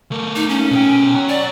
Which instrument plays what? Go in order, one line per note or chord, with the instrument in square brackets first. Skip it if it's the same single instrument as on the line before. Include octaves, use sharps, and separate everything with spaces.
[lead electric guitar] A3 A#4
[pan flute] D#4
C#4
[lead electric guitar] B2 G5
C#5 A#5
[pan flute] D5